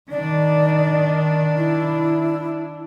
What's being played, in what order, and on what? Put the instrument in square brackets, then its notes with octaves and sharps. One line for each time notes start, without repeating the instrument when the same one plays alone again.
[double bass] D#3 [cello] D4 [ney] D5
[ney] E4